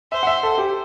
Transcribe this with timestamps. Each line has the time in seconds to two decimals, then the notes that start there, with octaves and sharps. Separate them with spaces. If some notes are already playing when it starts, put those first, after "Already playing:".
0.12 C5 E5
0.23 F#5
0.27 E5
0.43 A4
0.58 G4